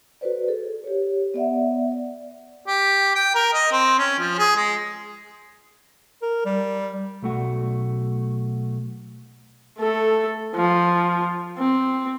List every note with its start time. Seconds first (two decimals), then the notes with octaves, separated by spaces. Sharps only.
0.21 F#4 A4 B4 C5 D5
0.48 G#4 A4
0.84 G4 C#5
1.34 B3 D5 E5 F#5
1.92 D5
2.66 G4
3.15 G5
3.35 A#4
3.53 D#5
3.72 C4
3.98 C#4
4.19 F3
4.38 G#4
4.56 G#3
6.22 A#4
6.46 G3
7.22 B1 A3 F#4
9.79 A3 A4
10.55 F3
11.58 C4